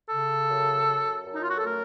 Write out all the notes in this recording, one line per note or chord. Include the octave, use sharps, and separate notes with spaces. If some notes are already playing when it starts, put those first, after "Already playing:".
C#3 A4
F#2
F#2
F#2
D#4
F4
F#4
A4
A3 A#4